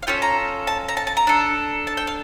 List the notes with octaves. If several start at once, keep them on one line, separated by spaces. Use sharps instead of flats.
F5
C#4 F4 A4 G5
A#5
A5
A#5
A5
A5
A#5
D4 A4
A5
G5
F5